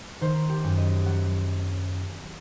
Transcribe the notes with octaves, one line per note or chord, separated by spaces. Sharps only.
D#3 C5
G4
F#2
D#5
F#3 F#5